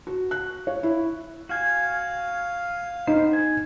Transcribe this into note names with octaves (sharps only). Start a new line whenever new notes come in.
F#4
F#6
C#5
E4
F#4 F5 G#5
B3 D#4 C5
G#5